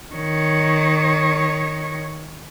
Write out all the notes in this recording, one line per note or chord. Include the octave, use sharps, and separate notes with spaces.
D#3 C#5